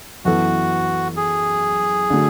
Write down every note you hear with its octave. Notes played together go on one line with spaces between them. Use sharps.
F#2 E3 B3 E4 F#4 A4
G#4
D3 F#3 A3